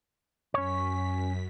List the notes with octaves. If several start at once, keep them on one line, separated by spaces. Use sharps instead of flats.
F#2 C#4 C#5 B6